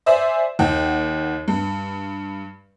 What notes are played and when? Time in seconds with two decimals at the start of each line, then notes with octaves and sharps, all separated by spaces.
0.06 C5 D5 E5 G#5
0.59 D#2 F#5 G5
1.48 G2